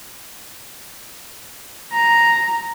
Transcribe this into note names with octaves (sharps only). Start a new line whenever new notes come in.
A#5